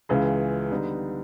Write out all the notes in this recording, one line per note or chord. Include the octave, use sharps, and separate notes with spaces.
C#2 C#3 E3 G#3
D3 G3 B3 D#4